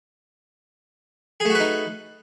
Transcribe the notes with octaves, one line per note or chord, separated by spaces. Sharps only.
A3 D#4 F#4 G#4 B4